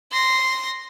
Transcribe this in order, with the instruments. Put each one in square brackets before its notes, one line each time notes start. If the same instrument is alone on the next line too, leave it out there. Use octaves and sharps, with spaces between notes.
[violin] C6 A#6